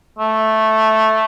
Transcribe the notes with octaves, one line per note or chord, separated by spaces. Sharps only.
A3